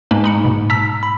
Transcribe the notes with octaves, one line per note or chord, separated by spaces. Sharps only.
G#2 A#3 D4 B4
D#4 B5 C#7
B2
A5 A#5 E6 B6
B5